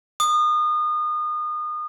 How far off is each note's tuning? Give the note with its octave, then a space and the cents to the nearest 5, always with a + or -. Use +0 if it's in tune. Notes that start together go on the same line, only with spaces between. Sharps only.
D#6 -30